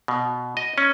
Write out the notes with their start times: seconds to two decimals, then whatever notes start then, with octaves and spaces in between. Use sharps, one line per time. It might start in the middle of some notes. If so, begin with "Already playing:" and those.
0.08 B2
0.57 D#5
0.78 C#4